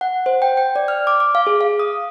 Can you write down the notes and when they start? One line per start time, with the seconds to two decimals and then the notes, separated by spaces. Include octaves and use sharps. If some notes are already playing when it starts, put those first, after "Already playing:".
0.01 F#5
0.26 C5
0.42 G5
0.57 G5
0.76 D5
0.88 F6
1.07 D6
1.20 D6
1.35 F5
1.47 G#4
1.61 F5
1.80 D#6